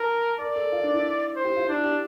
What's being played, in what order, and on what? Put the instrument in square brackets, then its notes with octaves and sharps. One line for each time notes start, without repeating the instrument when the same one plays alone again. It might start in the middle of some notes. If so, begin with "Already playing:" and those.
Already playing: [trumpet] A#4 [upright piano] A5
[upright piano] A#4 [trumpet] D5
[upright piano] A4
F4
D4
E4
[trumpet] C5
[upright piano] G4
F4
[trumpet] D4 [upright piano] E4
[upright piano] G4